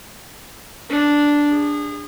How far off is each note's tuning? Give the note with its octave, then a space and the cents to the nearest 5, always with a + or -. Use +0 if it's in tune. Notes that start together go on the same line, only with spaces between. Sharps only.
D4 -5
G#4 -30